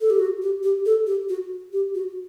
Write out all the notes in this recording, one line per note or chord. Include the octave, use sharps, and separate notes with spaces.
A4
G4
F#4
G4
G4
A4
G4
F#4
G4
F#4